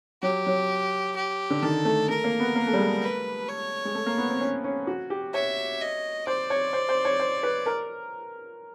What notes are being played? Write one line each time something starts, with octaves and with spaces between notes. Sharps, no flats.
F#3 G4
F#3
G4
D3
D#3 A4
A3
A3 A#4
A#3
B3
A#3
A3
G3
G#3
A3
B4
C#5
G#3
A3
A#3
B3
C4
C#4
C#4
F#4
G4
C#5 E5
D#5
C5 D5
C#5
C5
C5
C#5
C5
B4
A#4